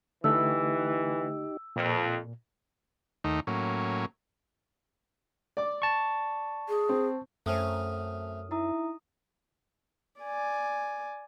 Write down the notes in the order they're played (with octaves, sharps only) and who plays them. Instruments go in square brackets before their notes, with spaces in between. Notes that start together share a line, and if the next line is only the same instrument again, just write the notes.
[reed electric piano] D3 A3 [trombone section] E3 [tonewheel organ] D#4 G4 [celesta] E6
[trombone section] F2 [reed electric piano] A#2
[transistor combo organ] D#2 D#3 A3 D#4
A2 F#3 A#3 C#4
[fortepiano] D5 D6
[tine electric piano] A5 C#6
[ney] G#4
[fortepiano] C4
[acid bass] F#2 [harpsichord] A3 C4 C#4 [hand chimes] A4 D#6 F6
[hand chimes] D#4 A#5 D#6 [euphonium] E4
[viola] D5 G#5